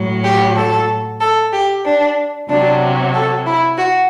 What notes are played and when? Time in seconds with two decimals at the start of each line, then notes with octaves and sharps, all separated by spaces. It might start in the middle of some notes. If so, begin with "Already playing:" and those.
Already playing: A2 F#3
0.23 G4
0.55 A4
1.20 A4
1.52 G4
1.84 D4
2.48 C3 F#3 D4
3.13 A4
3.46 E4
3.77 F#4